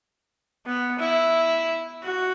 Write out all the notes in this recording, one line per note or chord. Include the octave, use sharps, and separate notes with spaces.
B3
E4
F#4